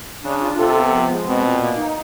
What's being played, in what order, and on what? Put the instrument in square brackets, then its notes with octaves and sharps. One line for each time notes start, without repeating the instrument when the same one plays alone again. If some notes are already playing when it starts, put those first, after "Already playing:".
[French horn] C#3 [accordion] D4
[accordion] F4
[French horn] C3 [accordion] A4
[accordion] B3
F3
G#3
[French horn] B2 [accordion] C4
[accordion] A#2
A#3
D#4